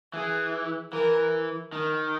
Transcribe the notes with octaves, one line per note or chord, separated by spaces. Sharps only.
E3 G#4
E3 A#4
D#3 A#4